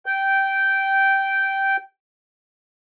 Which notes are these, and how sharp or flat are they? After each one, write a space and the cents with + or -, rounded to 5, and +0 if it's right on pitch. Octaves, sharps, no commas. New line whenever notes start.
G5 -10